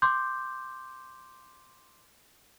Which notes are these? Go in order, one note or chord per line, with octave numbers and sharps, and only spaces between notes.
C6 D6 G6